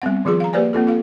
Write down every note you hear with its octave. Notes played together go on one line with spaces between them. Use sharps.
G3 B3 C4 F#5
D#3 F3 F4 G#4 C6
F5 A#5
A#3 G4 B4 C5 D5 G#5
A#3 C4 F4 A4
F4 A4 F5